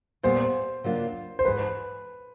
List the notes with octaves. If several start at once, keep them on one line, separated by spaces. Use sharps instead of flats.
A#2 G3 B3 C5
C#3 F#3 A#3 D4 F4
C5
G#2 E3 G#3 B4